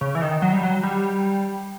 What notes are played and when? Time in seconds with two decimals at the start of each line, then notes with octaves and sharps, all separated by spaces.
0.01 C#3
0.15 E3
0.22 D#3
0.42 F#3
0.53 G3
0.63 F#3
0.83 G3